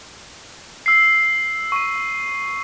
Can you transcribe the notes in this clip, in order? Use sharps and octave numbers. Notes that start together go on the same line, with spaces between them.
E6 C7
C#6 D#7